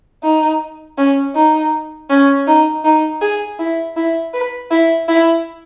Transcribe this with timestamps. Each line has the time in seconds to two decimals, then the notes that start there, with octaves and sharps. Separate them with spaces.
0.24 D#4
0.98 C#4
1.35 D#4
2.10 C#4
2.47 D#4
2.85 D#4
3.21 G#4
3.59 E4
3.96 E4
4.34 B4
4.71 E4
5.08 E4